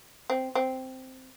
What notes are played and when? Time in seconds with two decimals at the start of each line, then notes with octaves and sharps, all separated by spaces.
0.30 C4
0.55 C4